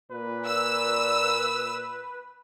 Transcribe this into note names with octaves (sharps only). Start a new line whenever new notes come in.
A#2 B4
E6